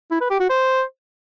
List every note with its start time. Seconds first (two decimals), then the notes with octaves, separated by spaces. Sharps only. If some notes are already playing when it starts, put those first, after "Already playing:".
0.11 E4
0.21 B4
0.30 G4
0.40 F#4
0.50 C5